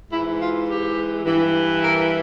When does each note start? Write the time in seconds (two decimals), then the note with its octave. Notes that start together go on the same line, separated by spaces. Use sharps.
0.12 G#2 E4
0.15 E3
0.40 F4
0.68 G4
1.25 G2 E3
1.82 A#4